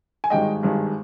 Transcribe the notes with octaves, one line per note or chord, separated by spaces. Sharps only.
G#5
G#1 G2 D#3 G#3 D#5 G5
G#1 G2 D#3 G#3